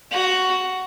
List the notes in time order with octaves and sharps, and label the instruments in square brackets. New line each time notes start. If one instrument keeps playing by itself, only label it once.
[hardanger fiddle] F#4